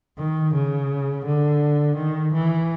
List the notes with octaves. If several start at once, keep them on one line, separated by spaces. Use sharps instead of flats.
D#3
C#3
D3
D#3
E3